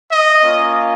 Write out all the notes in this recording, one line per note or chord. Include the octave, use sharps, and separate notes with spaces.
D#5
A#3 C#4 F4